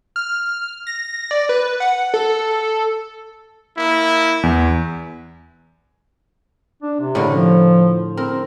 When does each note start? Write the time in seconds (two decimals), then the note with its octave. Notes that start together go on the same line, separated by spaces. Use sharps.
0.16 F6
0.87 A#6
1.31 D5
1.49 B4
1.80 F#5
2.14 A4
3.76 A#3 E4
4.43 E2
6.82 D4
7.00 C3
7.15 A2 D3 A#4
7.33 F3
8.17 C4 A#4